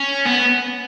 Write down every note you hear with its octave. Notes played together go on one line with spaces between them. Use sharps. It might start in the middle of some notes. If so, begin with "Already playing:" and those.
Already playing: C#4
B3